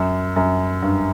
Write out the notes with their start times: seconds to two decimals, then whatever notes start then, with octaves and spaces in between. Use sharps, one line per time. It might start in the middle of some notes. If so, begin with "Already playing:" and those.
Already playing: F#2
0.36 F#2
0.82 G2